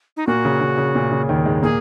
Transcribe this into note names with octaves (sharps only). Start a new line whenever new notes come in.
D#4
A#2 A#3 F#4
C#3
C#3
C#3
A#2
C#3
D#2 D#3
G#2 G#3
A#2 A#3 G#4